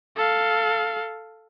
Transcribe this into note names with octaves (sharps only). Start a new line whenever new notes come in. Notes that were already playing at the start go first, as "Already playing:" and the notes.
A4 F5